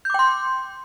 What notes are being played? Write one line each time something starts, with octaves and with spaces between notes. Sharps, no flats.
G5 C6 D6 G6